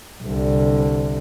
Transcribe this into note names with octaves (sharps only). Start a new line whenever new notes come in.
C2 D3